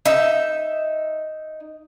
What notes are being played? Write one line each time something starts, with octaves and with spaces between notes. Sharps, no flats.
D#4 E5